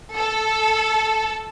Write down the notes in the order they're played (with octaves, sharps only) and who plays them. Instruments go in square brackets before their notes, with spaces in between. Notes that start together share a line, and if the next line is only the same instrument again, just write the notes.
[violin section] A4